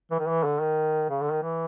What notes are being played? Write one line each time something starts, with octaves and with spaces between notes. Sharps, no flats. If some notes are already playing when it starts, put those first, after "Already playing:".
E3
D#3
E3
D3
D#3
C#3
D3
D#3
E3